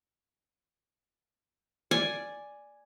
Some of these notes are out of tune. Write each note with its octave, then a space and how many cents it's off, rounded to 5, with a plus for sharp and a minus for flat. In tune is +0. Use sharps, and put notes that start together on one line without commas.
D5 +0 G#5 +0